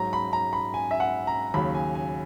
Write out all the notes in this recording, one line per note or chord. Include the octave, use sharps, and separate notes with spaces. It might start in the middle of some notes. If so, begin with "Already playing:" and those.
Already playing: G#2 F#3 A#5
B5
A#5
B5
G#5
E5
F#5
A#5
D#2 C#3 F#3 B5
G#5
G#5